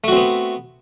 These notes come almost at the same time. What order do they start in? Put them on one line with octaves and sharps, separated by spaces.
A3 F#4 C4 B3